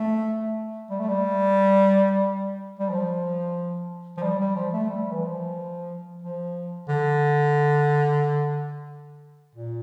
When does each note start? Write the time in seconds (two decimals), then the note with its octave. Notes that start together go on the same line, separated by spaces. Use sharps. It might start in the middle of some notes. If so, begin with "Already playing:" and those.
Already playing: A3
0.90 G3
0.99 A3
1.08 G3
2.79 G3
2.90 F3
4.17 F3
4.22 G3
4.39 G3
4.55 F3
4.73 A3
4.89 G3
5.12 E3
5.22 F3
6.22 F3
6.88 D3
9.55 A#2